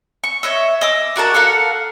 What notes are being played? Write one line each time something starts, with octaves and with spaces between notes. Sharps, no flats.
C#6
C#5 D#5 E5
D#5 D6 E6
D4 F#4 A#4 A5
A4 A#4 F5 F#5